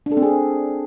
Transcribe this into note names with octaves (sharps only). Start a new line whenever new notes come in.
D4
A4
C4
G#4